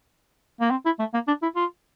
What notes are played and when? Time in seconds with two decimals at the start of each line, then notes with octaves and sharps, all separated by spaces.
0.61 A#3
0.71 C4
0.85 E4
0.99 A3
1.14 A#3
1.28 D4
1.42 E4
1.56 F4